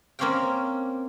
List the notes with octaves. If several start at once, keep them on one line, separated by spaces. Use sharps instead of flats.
A#3 C4 C#4 D5 F5 G5